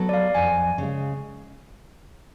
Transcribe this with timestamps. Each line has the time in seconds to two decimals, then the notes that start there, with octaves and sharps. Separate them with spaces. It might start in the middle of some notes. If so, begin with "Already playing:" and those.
Already playing: F#3 B3 F#4 A4
0.09 D5
0.14 F5
0.35 F2 G#5
0.78 C#3 G#3